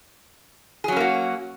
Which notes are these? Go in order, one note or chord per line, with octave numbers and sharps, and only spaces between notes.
F#3 A#3 C#4 F#4 G#4